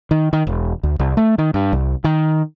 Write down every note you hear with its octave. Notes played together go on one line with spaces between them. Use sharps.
D#3
D#3
E1
D2
C2
A3
D#3
G2
C2
D#3